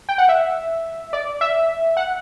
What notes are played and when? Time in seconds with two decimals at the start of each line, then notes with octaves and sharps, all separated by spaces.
0.09 G5
0.18 F#5
0.29 E5
1.13 D5
1.41 E5
1.97 F#5